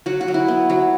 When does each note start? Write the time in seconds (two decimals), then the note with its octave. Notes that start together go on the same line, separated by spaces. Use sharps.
0.06 F#3 F#4
0.21 F#4
0.28 F#3
0.34 E4
0.48 B3
0.70 F#3